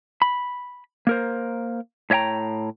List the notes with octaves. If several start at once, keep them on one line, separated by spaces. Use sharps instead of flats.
B5
A#3 A#4 C5
A2 C#5 D#5 G5 A#5